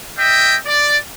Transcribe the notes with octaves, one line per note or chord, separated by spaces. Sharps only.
D#5 E5 G5
D5